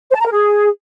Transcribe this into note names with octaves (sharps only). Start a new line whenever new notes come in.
C5
A5
A#5
A#4
G#4